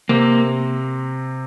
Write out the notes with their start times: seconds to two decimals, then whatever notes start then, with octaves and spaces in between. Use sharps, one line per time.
0.09 C3 A#3 C4